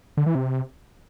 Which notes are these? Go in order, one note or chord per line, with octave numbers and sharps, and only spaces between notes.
D3
E3
C3